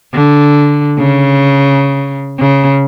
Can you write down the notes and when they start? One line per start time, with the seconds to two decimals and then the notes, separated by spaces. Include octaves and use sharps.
0.14 D3
0.99 C#3
2.39 C#3